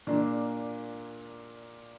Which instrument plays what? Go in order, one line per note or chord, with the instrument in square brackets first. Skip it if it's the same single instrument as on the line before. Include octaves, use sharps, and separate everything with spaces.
[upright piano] A#2 A#3 D4